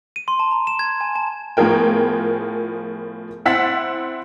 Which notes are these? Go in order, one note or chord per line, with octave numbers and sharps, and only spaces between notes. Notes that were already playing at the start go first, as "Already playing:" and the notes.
D#7
C6
A5
A#5
E7
G#6
G#5
A5
A2 F3 B3 G#4 A#4 G5
C4 E4 F#5 E6 A6 B6